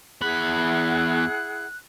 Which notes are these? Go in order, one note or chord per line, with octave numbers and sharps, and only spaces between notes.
E2 E4 G#4 F#5 B5 F#6